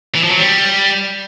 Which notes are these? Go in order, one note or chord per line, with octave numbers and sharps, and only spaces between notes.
E3
F3
F#3
G3